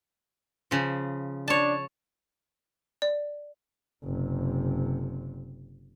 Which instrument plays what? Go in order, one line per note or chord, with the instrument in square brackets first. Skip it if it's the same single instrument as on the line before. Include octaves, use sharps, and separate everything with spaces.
[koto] C#3 F3
[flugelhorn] D4 [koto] C#5 A5
[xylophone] D5
[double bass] F#1 C3